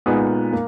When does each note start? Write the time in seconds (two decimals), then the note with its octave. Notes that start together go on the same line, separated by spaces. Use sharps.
0.06 A#2 G#3 B3 D#4
0.53 A#3